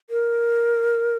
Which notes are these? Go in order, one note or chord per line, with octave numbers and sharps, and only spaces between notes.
A#4